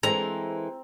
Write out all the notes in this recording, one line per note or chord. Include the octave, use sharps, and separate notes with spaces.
E3 G#3 C4 A4 A#5